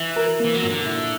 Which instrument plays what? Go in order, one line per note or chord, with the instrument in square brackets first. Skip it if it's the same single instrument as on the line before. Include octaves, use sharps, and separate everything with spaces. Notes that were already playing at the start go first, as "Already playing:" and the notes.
Already playing: [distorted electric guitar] E3 [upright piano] E4
[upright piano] A#4
[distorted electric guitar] E3 [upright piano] A#3
[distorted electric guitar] F#3
[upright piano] A#2
[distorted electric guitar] D3
[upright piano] E4